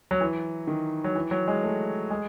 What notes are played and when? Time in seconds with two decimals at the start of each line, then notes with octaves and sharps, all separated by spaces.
0.11 F#3
0.21 E3
0.67 D#3
1.04 F#3
1.15 E3
1.31 F#3
1.48 G#3
1.63 A3
2.10 G#3